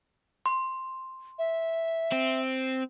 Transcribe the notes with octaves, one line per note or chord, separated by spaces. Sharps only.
C6
E5
C4